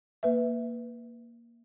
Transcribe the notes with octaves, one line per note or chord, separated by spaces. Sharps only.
A#3 B4 E5